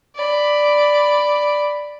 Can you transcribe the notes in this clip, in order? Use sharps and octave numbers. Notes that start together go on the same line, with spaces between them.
D5 B5